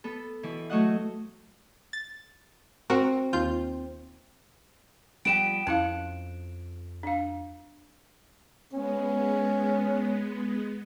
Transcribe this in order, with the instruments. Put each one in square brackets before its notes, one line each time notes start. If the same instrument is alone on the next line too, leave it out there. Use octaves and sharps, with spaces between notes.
[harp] B3 A4
B2 E3 E4
F#3 A3 F#4 D#5 F#5
[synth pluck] A6
[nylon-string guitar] C4 [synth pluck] F#4 A#4
[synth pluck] D#2 F4 G6
[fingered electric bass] F3 G3 [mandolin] B3 F#4 G4 [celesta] D7 E7
[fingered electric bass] F2 [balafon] C#4 E4 F5 [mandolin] F#6
[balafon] D4 F5
[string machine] G#3 B3 [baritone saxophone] C#4